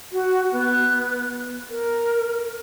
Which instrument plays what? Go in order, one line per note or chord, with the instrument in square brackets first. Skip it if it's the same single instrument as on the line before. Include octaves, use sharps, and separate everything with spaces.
[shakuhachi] F#4
B3
A#4